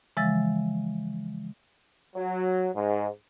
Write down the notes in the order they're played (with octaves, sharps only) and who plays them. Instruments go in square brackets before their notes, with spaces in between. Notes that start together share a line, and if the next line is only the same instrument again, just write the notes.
[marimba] C#3 E3 F3 G#3 E6 A6
[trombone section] F#3
G#2